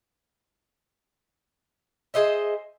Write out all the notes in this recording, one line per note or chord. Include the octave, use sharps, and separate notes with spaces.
G#4 C5 D#5 E5